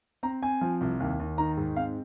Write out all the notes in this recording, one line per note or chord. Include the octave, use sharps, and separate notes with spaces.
C4 A#5
C4 G#5
F3
C2
D#2
D#2
D#3 A#5
G#2
C4 F5